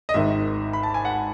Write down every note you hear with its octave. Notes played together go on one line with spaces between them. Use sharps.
D#5
G#1 G#2 D#3 E5
B5
A5
G#5
F#5